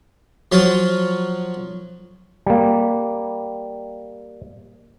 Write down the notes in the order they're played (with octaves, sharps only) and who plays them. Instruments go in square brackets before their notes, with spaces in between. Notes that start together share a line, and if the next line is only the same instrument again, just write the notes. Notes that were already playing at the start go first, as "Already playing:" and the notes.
[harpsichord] F3 F#3 F4 C6
[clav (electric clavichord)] G3 A#3